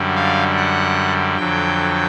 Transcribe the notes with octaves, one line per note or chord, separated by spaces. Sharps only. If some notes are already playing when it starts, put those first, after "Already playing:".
Already playing: F#2 D3 G3
F5
F#5
F2 D3 F#3 G5